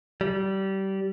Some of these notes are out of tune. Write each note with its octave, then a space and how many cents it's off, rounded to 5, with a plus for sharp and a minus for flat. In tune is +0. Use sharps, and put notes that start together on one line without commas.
G3 -25